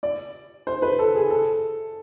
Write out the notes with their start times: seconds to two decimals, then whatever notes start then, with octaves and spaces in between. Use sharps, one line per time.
0.03 D5
0.67 C5
0.82 B4
0.99 A4
1.15 G#4
1.30 A4